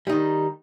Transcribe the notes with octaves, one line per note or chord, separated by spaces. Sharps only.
D#3 G3 D#4